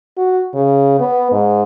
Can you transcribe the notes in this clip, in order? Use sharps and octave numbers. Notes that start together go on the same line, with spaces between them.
F#4
C#3
B3
G#2